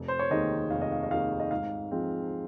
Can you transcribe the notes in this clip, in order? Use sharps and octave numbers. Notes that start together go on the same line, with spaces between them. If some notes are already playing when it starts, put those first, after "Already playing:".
Already playing: F1
C5
C#5
D#2 D#3 G#3 D#5
F1 F5
D#5
F5
D#5
D#2 D#3 G#3 F5
D#5
G#2 F5
F3 G#3 C4